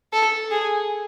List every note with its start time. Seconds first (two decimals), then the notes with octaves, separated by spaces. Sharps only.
0.13 A4
0.51 G#4